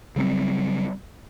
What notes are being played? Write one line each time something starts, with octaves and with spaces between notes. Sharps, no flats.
C#3 F#3 G3 C4